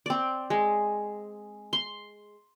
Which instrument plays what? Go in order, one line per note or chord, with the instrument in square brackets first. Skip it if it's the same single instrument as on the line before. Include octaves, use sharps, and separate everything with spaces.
[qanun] C4 D5
G#3
C6